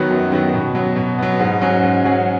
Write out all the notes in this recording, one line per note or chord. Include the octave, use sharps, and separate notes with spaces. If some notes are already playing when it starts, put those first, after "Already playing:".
Already playing: D#3 F#3 B3 F#4
F#2
D#3 F#3 B3 F#4
B2
F#3 B3
B2
F#3 B3
G#2
F#3 C#4 G#4
G#2
F#3 C#4 G#4